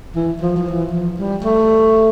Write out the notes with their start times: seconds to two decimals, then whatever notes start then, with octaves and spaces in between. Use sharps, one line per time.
0.15 E3
0.41 F3
0.56 F3
0.67 E3
0.92 F3
1.18 G3
1.44 A3